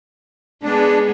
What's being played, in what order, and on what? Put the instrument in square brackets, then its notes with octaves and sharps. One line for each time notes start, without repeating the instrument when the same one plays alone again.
[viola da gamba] G#3 B3 G#4 [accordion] D4